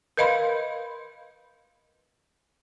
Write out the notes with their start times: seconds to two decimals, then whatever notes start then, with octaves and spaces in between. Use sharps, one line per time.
0.17 A#4 B4 D#5 F5 B5 C6